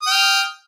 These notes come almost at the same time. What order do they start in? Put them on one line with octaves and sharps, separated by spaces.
D#6 G5 F6